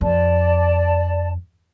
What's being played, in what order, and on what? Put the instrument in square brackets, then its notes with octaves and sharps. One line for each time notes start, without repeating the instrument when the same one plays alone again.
[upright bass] F2 [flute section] D5 A5